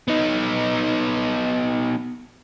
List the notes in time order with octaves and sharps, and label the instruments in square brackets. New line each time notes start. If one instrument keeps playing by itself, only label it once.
[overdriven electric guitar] B3 D#4